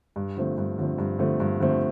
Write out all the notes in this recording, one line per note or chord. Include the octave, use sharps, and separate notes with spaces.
G2
D3 F3 A3 C4
G2
D3 F3 A3 C4
G2
D3 F3 A3 C4
G2
D3 F3 A3 C4